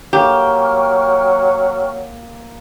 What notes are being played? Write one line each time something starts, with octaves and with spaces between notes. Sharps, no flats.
F#3 A#3 G4 G5 C#6 F6